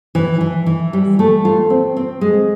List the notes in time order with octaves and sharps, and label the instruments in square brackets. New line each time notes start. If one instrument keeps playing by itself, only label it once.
[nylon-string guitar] E3
E3
E3
G3
A3
F4
C4
C4
G#3